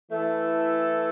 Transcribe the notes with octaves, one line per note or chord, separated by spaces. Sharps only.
E3 A3 E4 A4